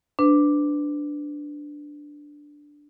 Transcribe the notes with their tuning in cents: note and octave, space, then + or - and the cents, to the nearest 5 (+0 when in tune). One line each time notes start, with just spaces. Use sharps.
D4 +0 B4 +25